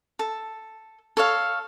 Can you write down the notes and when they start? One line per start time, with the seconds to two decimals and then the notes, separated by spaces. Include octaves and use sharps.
0.19 A4
1.17 A4 C#5 F5